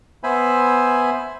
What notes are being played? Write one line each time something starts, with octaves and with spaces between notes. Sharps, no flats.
B3 C5 E5 G#5 B5